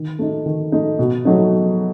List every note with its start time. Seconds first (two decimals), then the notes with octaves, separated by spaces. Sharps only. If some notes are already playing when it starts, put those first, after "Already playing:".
Already playing: D#3
0.19 A3 D#4
0.46 D#3
0.72 A3 D#4
0.99 B2
1.25 F#3 A3 D#4